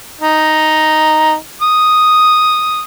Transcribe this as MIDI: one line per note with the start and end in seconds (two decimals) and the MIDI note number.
0.21 1.36 63
1.61 2.82 87